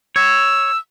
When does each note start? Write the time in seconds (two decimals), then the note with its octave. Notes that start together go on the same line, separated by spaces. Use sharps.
0.16 C#5 E6